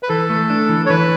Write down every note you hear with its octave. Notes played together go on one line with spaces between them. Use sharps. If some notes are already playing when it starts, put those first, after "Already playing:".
B4
E3 A4
A3
D4
E3
C#5
E3 B4